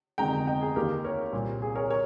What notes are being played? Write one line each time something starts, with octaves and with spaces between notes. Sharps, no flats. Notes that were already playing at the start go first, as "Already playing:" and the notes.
G1 F2 C3 D#3 G#3 G5 A#5
D#5 G5
G#4
D#2 D#3 A#3 G4 A#4
A#4 C#5
C2 A#2 G3 C4
G#4
A#4 C#5
A#4 C#5